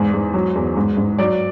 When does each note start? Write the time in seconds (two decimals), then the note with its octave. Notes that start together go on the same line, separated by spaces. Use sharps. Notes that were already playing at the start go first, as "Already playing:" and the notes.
Already playing: E2 G#2
0.13 G#2
0.34 F#3
0.55 E2
0.77 G#2
0.97 G#2
1.18 F#3 D5